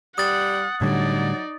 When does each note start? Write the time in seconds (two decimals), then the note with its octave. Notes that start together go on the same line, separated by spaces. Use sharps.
0.18 G3 F#5 D#6 A6
0.81 A2 D3 F#3 G3 D#4 D5